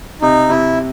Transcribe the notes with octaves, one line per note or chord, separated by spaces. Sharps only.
C3 D#4
C3 E4